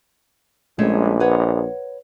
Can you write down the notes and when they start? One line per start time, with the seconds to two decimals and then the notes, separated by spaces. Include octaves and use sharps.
0.79 A#1 G#3 A3 C#4
1.20 B4 C#5 F#5